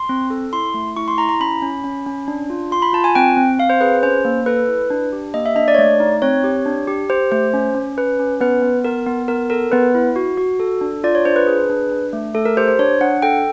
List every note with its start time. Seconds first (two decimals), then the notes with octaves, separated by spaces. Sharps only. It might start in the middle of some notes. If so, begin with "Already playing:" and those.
Already playing: C6
0.09 C4
0.30 A4
0.53 E4 C6
0.74 A3
0.96 E4 C#6
1.08 C6
1.18 E4 A#5
1.29 A#5
1.40 C#4 B5
1.62 C#4
1.84 C#4
2.06 C#4
2.28 D4
2.50 F4
2.71 F4 C6
2.82 B5
2.93 F4 A5
3.04 G#5
3.15 C4 G5
3.37 C4
3.59 C4 F5
3.70 C5
3.81 G#4 B4
4.03 C#4 C5
4.25 A#3
4.46 A4 B4
4.68 E4
4.90 D4
5.12 G4
5.34 A#3 D#5
5.46 E5
5.56 D4 D#5
5.68 D5
5.75 C#5
5.79 A3 D5
6.00 D#4
6.22 C4 C#5
6.44 G4
6.66 D4
6.88 G4
7.10 G4 C5
7.31 A3 C5
7.54 C#4
7.75 C#4
7.97 C#4 B4
8.20 C#4
8.41 B3 B4
8.63 B3
8.84 B3 A#4
9.07 B3
9.28 B3 A#4
9.50 A4 A#4
9.72 B3 B4
9.95 E4
10.16 F#4
10.37 F#4
10.60 A4
10.81 D4
11.04 F4 D5
11.15 C#5
11.25 D4 C5
11.36 B4
11.47 G#4
11.70 D4
11.92 D4
12.13 A3
12.34 A3 A4
12.45 A#4
12.57 G4 C5
12.68 C5
12.79 D4 C#5
13.01 D4 F#5
13.22 A4 G5